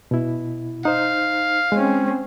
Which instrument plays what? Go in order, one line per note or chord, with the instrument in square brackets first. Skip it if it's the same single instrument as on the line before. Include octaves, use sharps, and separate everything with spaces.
[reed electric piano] B2 E4
[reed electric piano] D#4 C5 [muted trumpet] F5
[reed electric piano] G#3 [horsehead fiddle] C4 C#4